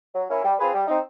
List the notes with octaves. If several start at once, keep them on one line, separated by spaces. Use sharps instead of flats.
F#3
A#3 C#4 E4
G3
C4 F4 G#4 B4
G3
C4 D#4